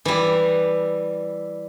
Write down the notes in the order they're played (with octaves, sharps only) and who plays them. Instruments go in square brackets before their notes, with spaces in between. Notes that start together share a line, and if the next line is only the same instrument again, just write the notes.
[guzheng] E3 G3